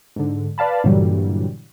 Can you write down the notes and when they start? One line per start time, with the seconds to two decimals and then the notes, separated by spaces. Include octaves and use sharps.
0.16 G#2 D3
0.58 B4 D5 F5 A5 B5
0.84 G2 A#2 D3 E3 F#3 G3